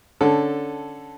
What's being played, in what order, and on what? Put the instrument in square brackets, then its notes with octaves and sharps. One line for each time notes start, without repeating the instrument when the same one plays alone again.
[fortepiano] D3 C#4 A4